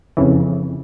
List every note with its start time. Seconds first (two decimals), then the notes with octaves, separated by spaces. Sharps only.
0.17 F2 C#3 E3